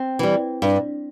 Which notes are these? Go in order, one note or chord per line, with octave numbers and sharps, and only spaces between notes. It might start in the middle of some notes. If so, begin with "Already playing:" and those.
Already playing: C4
E3 G3
G2